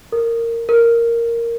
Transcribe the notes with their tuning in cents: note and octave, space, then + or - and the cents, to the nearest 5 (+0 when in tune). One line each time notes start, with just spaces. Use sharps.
A#4 -15
A#4 -5